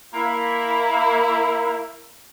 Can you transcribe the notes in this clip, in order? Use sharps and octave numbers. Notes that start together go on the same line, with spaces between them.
A#3 E4